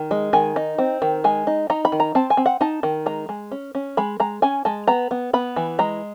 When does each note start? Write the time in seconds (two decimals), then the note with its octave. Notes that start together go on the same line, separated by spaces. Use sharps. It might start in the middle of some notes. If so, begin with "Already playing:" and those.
Already playing: D#3
0.11 G#3
0.33 D#3 G#5
0.56 D#4
0.78 C4
1.02 D#3
1.24 G#3 G#5
1.47 D#4
1.70 D#4 A#5
1.85 B5
1.92 D#3
2.00 A#5
2.15 C4 A5
2.30 G#5
2.37 C4
2.46 F#5
2.61 D#4 A5
2.83 D#3
3.06 G#3 A#5
3.29 G#3
3.52 C#4
3.75 C#4
3.97 G#3 B5
4.20 G#3 A#5
4.42 C#4 G#5
4.65 G#3 A5
4.87 B3 A#5
5.11 B3
5.33 B3 B5
5.56 E3
5.79 G#3 A#5